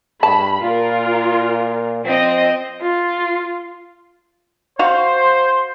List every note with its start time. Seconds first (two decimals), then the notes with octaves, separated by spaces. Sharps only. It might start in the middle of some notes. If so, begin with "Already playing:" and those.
0.23 G2 A5 B5
0.61 A#2 F4 A#4
2.04 F3 C4 D#5
2.81 F4
4.79 F#4 C5 F5